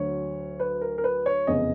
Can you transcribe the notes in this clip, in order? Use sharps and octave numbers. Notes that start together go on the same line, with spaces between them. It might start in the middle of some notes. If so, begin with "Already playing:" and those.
Already playing: D2 D3 F#3 C#5
B4
A#4
A#4
B4
C#5
F1 E2 C#3 D#5